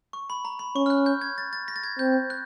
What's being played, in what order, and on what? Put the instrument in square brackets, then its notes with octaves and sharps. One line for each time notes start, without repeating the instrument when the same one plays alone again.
[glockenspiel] C#6
B5
A#5
B5
[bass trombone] C#4 [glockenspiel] C#6
[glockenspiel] F6
F#6
G6
G#6
A6
A6
A#6
A6
G#6
[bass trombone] C4 [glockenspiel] G6
[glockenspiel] F#6